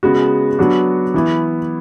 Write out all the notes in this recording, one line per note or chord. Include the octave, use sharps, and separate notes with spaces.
C#3 G#3 B3 F#4
F#3 B3 D4 F#4
E3 B3 E4